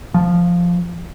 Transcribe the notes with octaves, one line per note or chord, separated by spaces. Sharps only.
F3